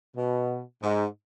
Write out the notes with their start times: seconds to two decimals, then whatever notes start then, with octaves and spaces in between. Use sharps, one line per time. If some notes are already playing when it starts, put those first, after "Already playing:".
0.16 B2
0.82 G#2